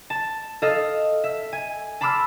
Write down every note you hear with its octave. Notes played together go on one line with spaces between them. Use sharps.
A5
A4 D#5 F5
E5
G#5
A5 B5 C6 D6 E6 F6